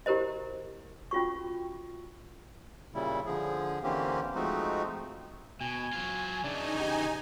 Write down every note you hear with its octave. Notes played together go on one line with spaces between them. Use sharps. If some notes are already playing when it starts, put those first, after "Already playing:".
E4 G4 A#4 C5 D#5
C#4 F4 F#4 C#6
A#2 C#3 G3 E4
D3 F3 G#4
D3 E3 A#3 C4 C#4 G4
F3 G#3 A3 C4 D#4 F#4
B2 G#5
F#3 F4
C#3 E3 D4 D#4 G#5
G4